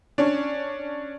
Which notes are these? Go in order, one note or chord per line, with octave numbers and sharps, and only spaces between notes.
C#4 D4